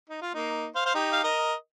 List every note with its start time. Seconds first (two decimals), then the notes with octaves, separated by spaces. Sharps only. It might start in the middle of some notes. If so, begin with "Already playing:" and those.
0.10 D#4
0.22 F4
0.34 A#3 D#4
0.75 C5 F5
0.85 C5 F5
0.95 D#4 G4
1.13 F5
1.23 A#4 D#5